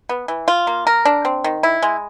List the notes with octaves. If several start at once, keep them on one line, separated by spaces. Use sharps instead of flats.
B3
E3
F4
A#3
A#4
D4
C4
D#3
E4
G#3